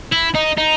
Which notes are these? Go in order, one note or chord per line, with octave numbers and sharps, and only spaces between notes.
E4
D#4
D#4